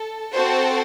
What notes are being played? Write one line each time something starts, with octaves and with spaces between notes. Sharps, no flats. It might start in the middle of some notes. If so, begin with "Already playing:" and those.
Already playing: A4
C4 F#4 A4 C5